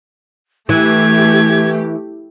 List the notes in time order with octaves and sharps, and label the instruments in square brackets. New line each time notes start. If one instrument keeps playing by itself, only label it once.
[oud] E3 [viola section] A3 G4 [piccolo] G#6